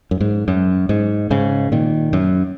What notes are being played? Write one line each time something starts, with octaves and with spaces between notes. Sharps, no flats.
F#2
G#2
F#2
G#2
G#2 C#3
A#2 D#3
F#2